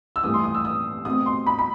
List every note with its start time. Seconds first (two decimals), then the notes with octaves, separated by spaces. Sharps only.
0.16 E6
0.23 G2 E3 A3 D#6
0.34 C6
0.44 D#6
0.55 E6
0.65 D#6
1.05 B2 A3 C4 D#6
1.26 C6
1.47 B5
1.59 B5